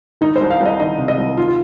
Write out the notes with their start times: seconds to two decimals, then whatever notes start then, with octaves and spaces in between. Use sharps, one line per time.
0.21 D#3 D#4
0.36 C5
0.41 C2
0.50 F5
0.61 C2 D#5
0.80 D#3 D#5
0.98 C3
1.08 D#5
1.18 C2
1.37 D#3 F4
1.48 F4